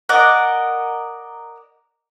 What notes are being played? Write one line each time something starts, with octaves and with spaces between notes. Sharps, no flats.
A#4 D5 D#5 F#5